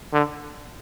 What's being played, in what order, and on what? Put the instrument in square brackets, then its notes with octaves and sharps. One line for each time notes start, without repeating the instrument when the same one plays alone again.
[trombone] D3